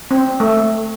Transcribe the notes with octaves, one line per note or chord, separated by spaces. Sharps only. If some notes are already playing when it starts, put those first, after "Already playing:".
C4
A3